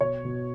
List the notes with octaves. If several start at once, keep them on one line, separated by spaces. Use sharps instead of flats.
B2 C#5
B2